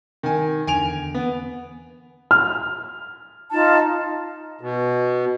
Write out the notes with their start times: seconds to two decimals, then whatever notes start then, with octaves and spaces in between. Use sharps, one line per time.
0.23 D#3 G#5
0.67 E2 D3 G#5 D7 F7
1.15 B3
2.31 F6
3.52 D#4 F4 A5
4.61 B2